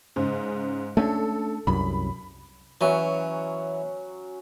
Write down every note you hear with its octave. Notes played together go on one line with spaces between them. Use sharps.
G#2 C#3
A3 C#4 D4 A4
C2 F#2 B5
E3 F#3 C#4 F#5